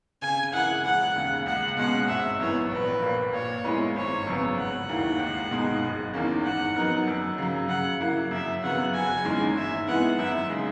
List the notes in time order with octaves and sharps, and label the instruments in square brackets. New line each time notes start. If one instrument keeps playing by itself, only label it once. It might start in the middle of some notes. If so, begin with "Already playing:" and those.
[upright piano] C#3 [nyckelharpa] G#5
[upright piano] E3 A#3 E4 G#4 [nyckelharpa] F#5
[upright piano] E1 [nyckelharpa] F#5
[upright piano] D#2 C#3
[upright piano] C#2 [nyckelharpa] F#5
[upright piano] B2 G#3 C#4 [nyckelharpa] F#5
[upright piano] G#1 [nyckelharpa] E5
[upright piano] F#2 E3 B3 [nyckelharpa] C#5
[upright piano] A#1 [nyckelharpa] B4
[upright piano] A#2 A#3
[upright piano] A#2 [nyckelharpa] C#5
[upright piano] G#3 B3 E4 B4
[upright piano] G#1 [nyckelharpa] C#5
[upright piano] F#2 C#3 F#3 B3
[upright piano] E1 [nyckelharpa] F#5
[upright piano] D#2 D#3 A#3 E4
C#2
B2 G#3 D#4
F#1
E2 D#3 A#3 C#4
[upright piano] G#2 [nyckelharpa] F#5
[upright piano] F#3 B3 D#4 A#4
F#2
C#3 F#3
[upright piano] C#3 [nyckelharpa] F#5
[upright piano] F#3 A#3 E4
[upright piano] F#2 [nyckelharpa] E5
[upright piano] C#3 F#3 B3 F#4 [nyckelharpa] F#5
[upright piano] F#1 [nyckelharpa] G#5
[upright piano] E2 D#3 G#3 C#4
[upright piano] G#2 [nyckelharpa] E5
[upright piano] E3 G#3 B3 E4 [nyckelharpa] F#5
[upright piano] F#2 [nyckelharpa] E5
[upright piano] C#3 G#3 D#4